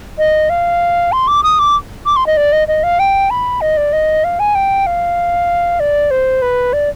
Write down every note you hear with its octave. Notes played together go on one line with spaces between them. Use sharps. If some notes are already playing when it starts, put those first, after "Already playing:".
D#5
F5
C6
D6
D#6
D6
D6
C6
D#5
D5
D#5
D#5
F5
G5
B5
D#5
D5
D#5
F5
G#5
G5
F5
D5
C5
B4
D5